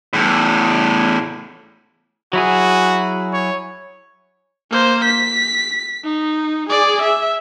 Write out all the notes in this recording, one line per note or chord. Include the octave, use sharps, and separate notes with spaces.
E2 A2
F#3 E4 F#4 G#4
C#5
A#3 C5
B6
D#4
G#4 D5
E5